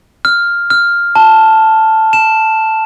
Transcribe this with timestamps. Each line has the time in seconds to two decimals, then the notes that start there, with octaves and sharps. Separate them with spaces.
0.25 F6
0.70 F6
1.16 A5
2.13 E7